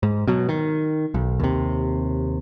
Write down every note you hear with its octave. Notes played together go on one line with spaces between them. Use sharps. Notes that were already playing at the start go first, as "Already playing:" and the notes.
G#2
B2 F#3
D#3
B1
D#2 C3